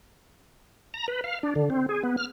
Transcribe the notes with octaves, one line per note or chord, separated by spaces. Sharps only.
A#5
B4
F5
D4
D3
C4
G#4
B3
F6